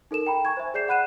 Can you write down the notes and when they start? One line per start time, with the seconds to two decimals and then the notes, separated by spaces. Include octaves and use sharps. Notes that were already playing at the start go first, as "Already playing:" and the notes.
0.11 D#4 A4 A#4 E7
0.26 G5 A#5 B5
0.45 G#5 C#6 G#6
0.57 C5 E5
0.74 G#4 D5 G6 C7 E7
0.88 F#5 B5 F#6 D#7 E7